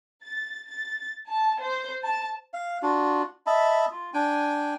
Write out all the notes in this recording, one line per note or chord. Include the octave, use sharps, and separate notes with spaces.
A6
A6
A5
C5
A5
F5
D4 F4 F#4
D#5 E5 A5 B5
F4
D4 G5 G#5